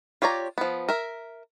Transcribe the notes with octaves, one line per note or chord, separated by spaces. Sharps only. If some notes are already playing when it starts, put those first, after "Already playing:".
F4 G4 C#5 D5 A#5
F3 B3
A#4 E5